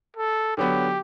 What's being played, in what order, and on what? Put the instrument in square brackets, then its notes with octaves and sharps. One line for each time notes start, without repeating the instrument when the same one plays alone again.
[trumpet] A4
[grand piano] D3 F#3 B3 [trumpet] G4